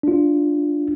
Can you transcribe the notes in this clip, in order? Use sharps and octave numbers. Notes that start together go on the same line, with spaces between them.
D4 F4